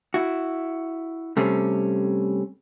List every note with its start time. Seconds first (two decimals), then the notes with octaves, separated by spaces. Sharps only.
0.14 E4 F#4
1.37 C3 G3 A3 C4 C#4